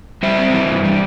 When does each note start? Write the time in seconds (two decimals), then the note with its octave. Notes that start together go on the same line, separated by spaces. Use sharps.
0.23 G3 C5 E5
0.38 C4
0.53 E3
0.69 G2
0.85 G3